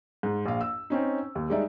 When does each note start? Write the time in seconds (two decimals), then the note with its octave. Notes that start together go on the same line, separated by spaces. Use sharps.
0.23 G#2
0.45 A#1 F5
0.61 E6
0.90 C4 C#4 D#4
1.35 D#2
1.50 G3 G#3 D#4 D5 E5